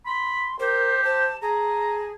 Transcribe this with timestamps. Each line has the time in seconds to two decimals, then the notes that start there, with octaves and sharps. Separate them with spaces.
0.06 B5 C6
0.59 G4 A#4 C5
1.04 C5 A5
1.42 G#4 A5 A#5